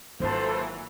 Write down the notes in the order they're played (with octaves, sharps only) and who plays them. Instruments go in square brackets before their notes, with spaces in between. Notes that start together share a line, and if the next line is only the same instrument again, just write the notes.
[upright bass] G#1 F4 [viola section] E3 F#3 A#3 [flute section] A4 C5